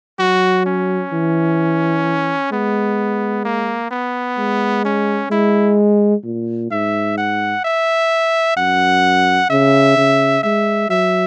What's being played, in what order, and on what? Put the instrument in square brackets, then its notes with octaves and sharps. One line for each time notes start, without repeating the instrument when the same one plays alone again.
[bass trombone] F#3 [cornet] F#4
[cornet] C#4
[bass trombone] E3
[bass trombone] G#3 [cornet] B3
[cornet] A#3
B3
[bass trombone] G#3
[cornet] C#4
[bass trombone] G#3 [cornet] E4
[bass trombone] A#2
[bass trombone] G#2 [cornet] E5
[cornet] F#5
E5
[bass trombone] F#2 [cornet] F#5
[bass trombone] C#3 [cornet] E5
[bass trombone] C#3
[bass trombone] G#3 [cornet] E5
[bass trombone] F#3 [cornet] E5